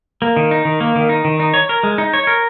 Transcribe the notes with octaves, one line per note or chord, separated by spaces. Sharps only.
A#3
D#3
D#4
D#3
A#3
D#3
D#4
D#3
D#4
C#5
A#4
G#3
D#4
C#5
A#4